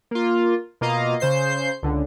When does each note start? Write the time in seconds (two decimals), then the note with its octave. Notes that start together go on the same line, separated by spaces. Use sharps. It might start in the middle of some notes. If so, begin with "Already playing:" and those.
0.11 A#3 F4
0.81 B2 A#3 F4 D#5 F5 A#5
1.20 C#3 C5 G6 C7
1.83 C#2 D3